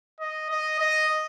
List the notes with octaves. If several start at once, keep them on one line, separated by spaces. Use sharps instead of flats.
D#5
D#5
D#5